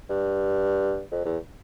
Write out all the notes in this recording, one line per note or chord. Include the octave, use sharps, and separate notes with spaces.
G2
F2
E2